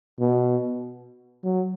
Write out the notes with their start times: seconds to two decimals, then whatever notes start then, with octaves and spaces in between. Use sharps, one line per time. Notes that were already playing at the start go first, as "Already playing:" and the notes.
0.20 B2
1.44 F#3